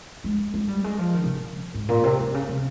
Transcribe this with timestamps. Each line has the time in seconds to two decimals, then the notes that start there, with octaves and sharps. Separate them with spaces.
0.24 G#3
0.54 G#3
0.68 G3
0.84 G#3
0.98 F3
1.14 D#3
1.24 C3
1.34 F2
1.74 G#2
1.89 A#2
2.03 C3
2.20 G3
2.29 C3
2.34 C#3
2.49 C3